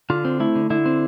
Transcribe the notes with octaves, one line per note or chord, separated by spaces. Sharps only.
D3 F4
C4
A3 E4
D3
D3 E4
C4